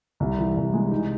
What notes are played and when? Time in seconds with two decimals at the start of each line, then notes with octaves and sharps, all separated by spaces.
0.20 C2
0.38 E3
0.56 C2
0.74 G#3
0.91 D#4